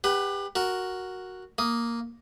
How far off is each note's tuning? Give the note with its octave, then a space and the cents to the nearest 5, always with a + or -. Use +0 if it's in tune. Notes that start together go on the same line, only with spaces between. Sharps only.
G4 +30 B4 +0 F#5 +45
F#4 +0 A#4 +0
A#3 +0 D#6 +0